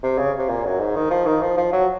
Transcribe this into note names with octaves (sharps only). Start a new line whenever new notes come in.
C3
C#3
C3
A#2
F#2
G#2
D#3
F3
D#3
F3
F3
F#3